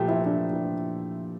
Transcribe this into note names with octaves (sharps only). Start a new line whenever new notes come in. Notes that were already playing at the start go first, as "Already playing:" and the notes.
Already playing: A#2 F3 A3 G4 A4
E4
D4
E4